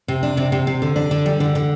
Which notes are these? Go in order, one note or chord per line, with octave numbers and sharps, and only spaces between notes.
C3
D4
C3
C3
C3
D3
D4
D3
G3
D3
D3